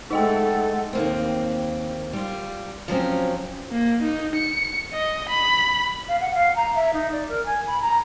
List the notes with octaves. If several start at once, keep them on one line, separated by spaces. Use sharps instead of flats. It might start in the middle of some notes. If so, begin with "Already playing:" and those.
G#3 A3 D#4 A4 D#5 F#5 G5
D#2 A#3 C4
G3 F4
F3 F#3 C4 C#4
A#3
D#4
C#7
D#5
B5
F5
F#5
F5
A#5
E5
D#4
D5
A#4
G#5
B5
A#5